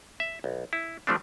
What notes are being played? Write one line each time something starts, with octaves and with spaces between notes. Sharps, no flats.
E5
B1
E4
F3 G3 A3 C4 D4